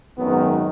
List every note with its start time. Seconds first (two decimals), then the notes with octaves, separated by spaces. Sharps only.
0.16 G#1 F#2 D#3 F#3 B3